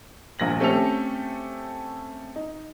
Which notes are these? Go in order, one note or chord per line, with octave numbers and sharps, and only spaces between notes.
D#1 A#1 A#2 A#6 F#7
A3 C4 C#4 G4 A4 F7
D#4